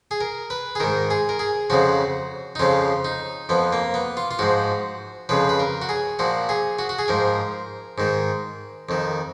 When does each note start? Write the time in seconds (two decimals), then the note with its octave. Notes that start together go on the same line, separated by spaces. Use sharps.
0.11 G#4
0.21 A#4
0.50 B4
0.75 G#4
0.80 G#2 D#3 A#4
1.10 G#4
1.29 A#4
1.39 G#4
1.70 F2 C#3 F3 F#4
2.55 D#4
2.59 F2 C#3 F3 F4
3.05 D#4
3.49 F2 F3 B3
3.73 A#3
3.94 B3
4.17 F4
4.31 F4
4.39 G#2 F3 F#4
5.29 F2 C#3 F3 B4
5.49 B4
5.60 A#4
5.82 F#4
5.89 G#4
6.19 A#2 F3 F#4
6.49 G#4
6.79 F#4
6.89 F#4
6.99 G#4
7.08 G#2 F3 A#4
7.98 G#2 D#3
8.89 F2 D#3